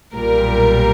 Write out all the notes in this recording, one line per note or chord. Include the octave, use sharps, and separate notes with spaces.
B1 A#2 G3 A#4